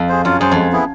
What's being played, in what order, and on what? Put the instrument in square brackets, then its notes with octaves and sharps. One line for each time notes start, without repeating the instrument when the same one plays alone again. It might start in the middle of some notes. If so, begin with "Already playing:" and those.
Already playing: [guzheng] F2
[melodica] G#4 C5
[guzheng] F#2 [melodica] F4
[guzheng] F#2 [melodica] G#4 C5
[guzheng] F2 [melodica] G#3
[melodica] B3 E4 G#4